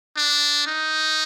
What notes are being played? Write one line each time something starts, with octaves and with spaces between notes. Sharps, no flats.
D4
D#4